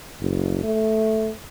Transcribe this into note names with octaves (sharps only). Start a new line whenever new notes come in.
F#1
A3